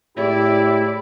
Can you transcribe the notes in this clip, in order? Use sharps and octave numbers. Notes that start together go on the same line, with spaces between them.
A2 G#3 E4 G4 D5